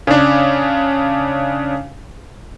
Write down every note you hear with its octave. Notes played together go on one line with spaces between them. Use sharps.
C#3 D4